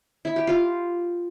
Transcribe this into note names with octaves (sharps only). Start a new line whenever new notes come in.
E4
G4
F4